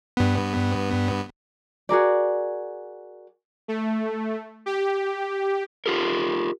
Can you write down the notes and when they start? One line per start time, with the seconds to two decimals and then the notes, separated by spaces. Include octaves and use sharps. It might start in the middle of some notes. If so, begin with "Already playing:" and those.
0.17 G2 B3
1.89 F#4 G#4 A#4 D5
3.68 A3
4.66 G4
5.86 F4 G4 A#4